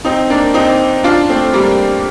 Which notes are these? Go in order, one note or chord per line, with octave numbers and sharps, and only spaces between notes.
C4 D#4
A#3 D4
C4 D#4
D4 F4
A3 C4
G3 A#3